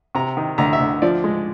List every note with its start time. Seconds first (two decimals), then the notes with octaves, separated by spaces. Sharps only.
0.15 C3 A#5
0.37 D#3
0.58 D2 A#5
0.73 E5
0.80 D2
1.02 F3 D5
1.24 G#3